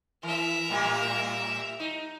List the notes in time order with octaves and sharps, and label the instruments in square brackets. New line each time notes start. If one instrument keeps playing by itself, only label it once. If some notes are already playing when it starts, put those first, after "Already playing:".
[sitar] E3 [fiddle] A#4 E5
[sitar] A2 G3 A#3
D#4